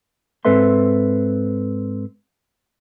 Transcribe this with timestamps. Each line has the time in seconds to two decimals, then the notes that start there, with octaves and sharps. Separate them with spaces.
0.45 G#2 C4 A4 B4 E5 C6